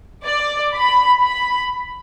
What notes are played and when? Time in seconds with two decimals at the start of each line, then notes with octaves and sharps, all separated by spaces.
0.25 D5
0.74 B5
1.24 B5